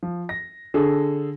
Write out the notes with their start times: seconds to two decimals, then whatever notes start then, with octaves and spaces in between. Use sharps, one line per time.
0.03 F3
0.29 A#6
0.74 D3 G#4 A4